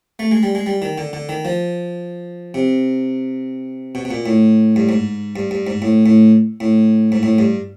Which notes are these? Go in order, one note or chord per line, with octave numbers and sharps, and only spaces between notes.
A3
G#3
G3
G#3
G3
D#3
D3
D3
D#3
F3
C3
B2
B2
A#2
A2
G2
G#2
G2
G2
G#2
A2
A2
A2
G#2
A2
G2